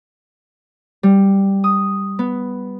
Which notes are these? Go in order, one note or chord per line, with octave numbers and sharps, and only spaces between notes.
G3
D#6
B3